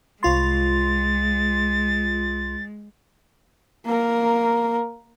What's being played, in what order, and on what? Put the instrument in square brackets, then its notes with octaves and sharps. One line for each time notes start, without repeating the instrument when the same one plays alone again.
[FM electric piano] C2 F4 C6 [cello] G#3 [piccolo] A6
[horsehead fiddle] A#3 A#4